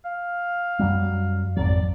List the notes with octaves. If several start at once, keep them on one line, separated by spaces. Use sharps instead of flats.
F5
F#2 F#3 G3
G#1 F2 F#3 D5